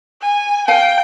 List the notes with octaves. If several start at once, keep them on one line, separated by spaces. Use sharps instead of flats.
G#5
F5 G5 G#5